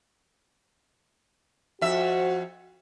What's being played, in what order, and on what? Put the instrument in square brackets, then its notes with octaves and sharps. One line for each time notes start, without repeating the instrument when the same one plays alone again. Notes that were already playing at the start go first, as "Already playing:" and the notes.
[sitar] F2 E5 [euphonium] F#4